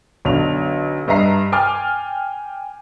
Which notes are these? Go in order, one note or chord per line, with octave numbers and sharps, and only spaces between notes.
B1 D3 F7
G2 D#5 E5 A#5 C7
G5 G#5 D6 F6 A6